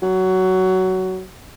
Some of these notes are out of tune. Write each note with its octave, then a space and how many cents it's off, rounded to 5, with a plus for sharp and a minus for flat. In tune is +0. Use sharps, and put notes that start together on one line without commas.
F#3 +15